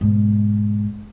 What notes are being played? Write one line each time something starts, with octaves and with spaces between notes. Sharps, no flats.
G#2 B2